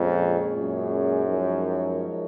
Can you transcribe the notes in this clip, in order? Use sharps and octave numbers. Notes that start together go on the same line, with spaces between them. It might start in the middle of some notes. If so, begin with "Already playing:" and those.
Already playing: F2 A#2 G#3 C#4 G#4 C#5
F#2
F3 G#3 D#4 A#4 C#5